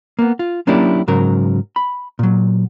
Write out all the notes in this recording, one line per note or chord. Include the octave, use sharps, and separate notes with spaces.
A#3 B3
F4
F#3 A#3 C#4 D4 E4 G4
G#2 C#3 F#3 A#4
B5
A#2 F#3